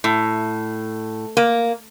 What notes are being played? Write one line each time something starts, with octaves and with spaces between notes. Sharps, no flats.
A2
A#3